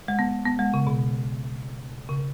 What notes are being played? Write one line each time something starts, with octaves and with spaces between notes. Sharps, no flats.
G#3
B3
B3
G#3
C#3
B2
C#3